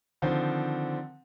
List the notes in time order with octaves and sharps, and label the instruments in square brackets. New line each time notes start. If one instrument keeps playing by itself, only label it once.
[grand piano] D3 D#3 F3 C4